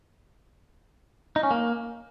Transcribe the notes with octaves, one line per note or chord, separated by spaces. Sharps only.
D#4
C#4
A#3